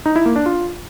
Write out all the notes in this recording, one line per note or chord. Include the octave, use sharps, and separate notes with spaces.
D#4
E4
A#3
D4
F4